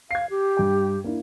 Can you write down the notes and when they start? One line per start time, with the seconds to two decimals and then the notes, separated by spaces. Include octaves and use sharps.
0.11 F5 G#6 C7
0.30 G4
0.57 G2 G5
1.04 A#3 D4 E4